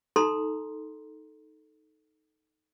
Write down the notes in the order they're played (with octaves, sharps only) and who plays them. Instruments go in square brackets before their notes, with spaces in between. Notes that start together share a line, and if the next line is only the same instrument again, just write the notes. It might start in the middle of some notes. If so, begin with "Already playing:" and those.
[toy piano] D#4 A4 A#5 C6